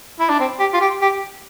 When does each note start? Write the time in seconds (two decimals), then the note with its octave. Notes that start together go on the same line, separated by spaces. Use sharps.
0.20 E4
0.29 D4
0.40 C4
0.59 G4
0.73 F4
0.81 G4
1.01 G4